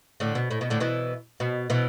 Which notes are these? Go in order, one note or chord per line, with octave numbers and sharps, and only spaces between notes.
A2 D3
B2
A2
B2
A2 D3
B2 E3
B2
B2 E3